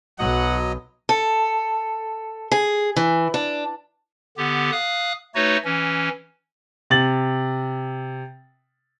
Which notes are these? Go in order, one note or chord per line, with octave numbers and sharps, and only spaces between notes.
B1 F#3 D#5 F#5
A4
G#4
E3
D4
D3 B3 G4
F5 D#6 F#6
A3 D#4 F#4 B4 C#5
E3 C#4
C3 A6 F#7